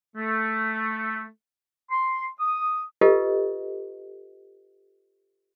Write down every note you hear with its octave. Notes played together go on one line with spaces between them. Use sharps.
A3
C6
D#6
F4 G4 A4 B4 D#5